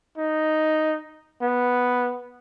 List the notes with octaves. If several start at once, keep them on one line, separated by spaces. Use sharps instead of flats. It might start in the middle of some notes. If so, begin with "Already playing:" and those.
D#4
B3